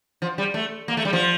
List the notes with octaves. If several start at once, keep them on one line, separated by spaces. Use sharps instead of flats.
F3
G3
A3
A#3
A3
G3
F3